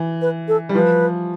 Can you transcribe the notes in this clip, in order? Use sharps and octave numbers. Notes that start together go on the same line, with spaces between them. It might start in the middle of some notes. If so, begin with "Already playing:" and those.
Already playing: E3
B4
A4
G3
F3 B4